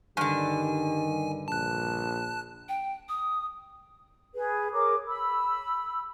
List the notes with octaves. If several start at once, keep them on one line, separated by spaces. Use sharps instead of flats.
G2 D3 D#3 G3 G#5
A#1 A5 F#6
G5
D#6
G#4 B4
G#4 A#4 C#5 D6
B5 E6